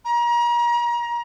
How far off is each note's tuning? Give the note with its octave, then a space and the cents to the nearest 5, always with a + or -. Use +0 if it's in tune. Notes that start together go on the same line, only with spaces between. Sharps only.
A#5 +35